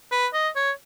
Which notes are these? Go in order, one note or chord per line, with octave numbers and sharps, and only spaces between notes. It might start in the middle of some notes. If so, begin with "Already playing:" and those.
B4
D#5
C#5